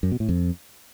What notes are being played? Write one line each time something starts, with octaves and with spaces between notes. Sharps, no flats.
F#2
B2
A2
F2